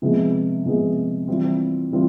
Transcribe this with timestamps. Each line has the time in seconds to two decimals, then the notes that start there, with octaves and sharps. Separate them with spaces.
0.02 C3 F3 G#3 B3
0.65 C3 F3 G#3 B3
1.28 E3 G3 C4 F4
1.91 E3 G3 C4 F4